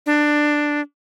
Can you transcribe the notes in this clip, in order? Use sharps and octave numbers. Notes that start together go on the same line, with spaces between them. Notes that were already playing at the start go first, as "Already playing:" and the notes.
D4